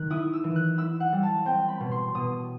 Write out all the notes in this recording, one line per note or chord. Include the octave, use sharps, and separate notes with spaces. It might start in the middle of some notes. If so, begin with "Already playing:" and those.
Already playing: D#3 F#6
E4 D#6
E6
E3
F#6
E4 E6
F#5
G3
A5
C4 G5
B5
B2
C6
B2 D#6